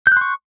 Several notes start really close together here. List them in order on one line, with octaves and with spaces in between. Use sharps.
G6 F#6 C6 C#6